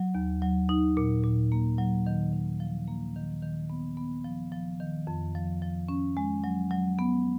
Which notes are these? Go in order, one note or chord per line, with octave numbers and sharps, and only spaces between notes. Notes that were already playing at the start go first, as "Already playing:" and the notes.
Already playing: F#3
D#2
F#3
D#4
A#2
A#2
A#3
F#3
D#3
D#3
F3
A#3
D#3
D#3
B3
B3
F3
F3
D#3
F2
F3
F3
C#4
G#3
F#3
F#3
B3